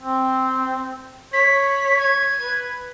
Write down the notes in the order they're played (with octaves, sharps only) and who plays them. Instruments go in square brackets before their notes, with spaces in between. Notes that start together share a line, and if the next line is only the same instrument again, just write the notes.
[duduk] C4
[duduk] C#5 [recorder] B6
[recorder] G#6
[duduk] B4